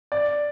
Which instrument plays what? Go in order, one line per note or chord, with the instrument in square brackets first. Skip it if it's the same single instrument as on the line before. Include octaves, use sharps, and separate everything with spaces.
[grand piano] D5